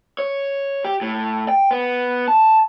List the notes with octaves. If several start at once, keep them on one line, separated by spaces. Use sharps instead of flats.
C#5
G4
A2
G5
B3
A5